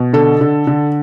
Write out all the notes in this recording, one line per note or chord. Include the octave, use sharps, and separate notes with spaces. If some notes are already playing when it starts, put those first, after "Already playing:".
Already playing: B2
D3 A4
D3
D3